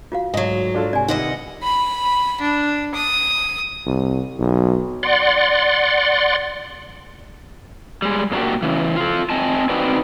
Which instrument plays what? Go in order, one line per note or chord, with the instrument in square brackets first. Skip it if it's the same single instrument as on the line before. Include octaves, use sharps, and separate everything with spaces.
[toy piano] F4 F#4 F5
[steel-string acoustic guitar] D2 F#3 [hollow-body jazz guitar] G#2 [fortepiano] D#5
[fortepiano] D4 F4 A4
[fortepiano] C3 [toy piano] D5 G#5
[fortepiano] C3 D#3 [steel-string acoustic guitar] E3 D#5 F#5
[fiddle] B5
D4
D#6
[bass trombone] C2
B1
[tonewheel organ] D5 F#5 C6
[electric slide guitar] G3 G#3
A#2 A3 A#3 D4 F#4 G4
C#3 E3
F4 A4
C4 D#5 G#5 A5
C4 D#4 F#4 B4 D5